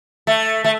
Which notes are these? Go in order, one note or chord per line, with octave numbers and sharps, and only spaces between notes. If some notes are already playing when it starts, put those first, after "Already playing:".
A3
A3